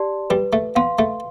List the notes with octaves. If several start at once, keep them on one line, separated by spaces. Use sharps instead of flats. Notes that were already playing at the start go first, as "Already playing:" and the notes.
Already playing: G4 D5 A5 C6
G3 B4
A3
B3 F5 C6
A3